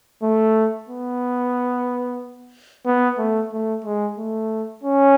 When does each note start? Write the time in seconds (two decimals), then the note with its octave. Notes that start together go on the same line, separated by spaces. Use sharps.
0.23 A3
0.89 B3
2.86 B3
3.18 A3
3.52 A3
3.84 G#3
4.18 A3
4.83 C#4